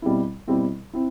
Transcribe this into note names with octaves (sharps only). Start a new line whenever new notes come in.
B2 G3 C4 E4
B2 G3 C4 E4
C4 E4